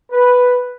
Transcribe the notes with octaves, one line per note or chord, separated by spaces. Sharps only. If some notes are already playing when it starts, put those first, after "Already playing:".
B4